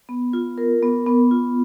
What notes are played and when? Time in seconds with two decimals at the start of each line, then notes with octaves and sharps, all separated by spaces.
0.09 B3
0.33 F4
0.58 A#4
0.83 B3
1.06 B3
1.31 F4